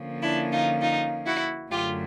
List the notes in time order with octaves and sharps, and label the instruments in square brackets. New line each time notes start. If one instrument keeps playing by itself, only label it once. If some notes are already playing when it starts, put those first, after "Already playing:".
Already playing: [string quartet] D3 F3 A#3 C#4
D4 E4
D#4 F4
D#4 F4
E4 F#4
F#2 D3 F#3 A3 F4 G4